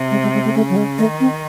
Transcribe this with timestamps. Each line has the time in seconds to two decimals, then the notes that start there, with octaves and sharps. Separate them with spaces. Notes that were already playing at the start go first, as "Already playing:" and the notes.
Already playing: C3
0.11 G#3
0.23 G#3
0.34 G#3
0.45 A3
0.55 C#3 A3
0.69 F#3
0.76 G#3
0.98 D#3 A3
1.20 C4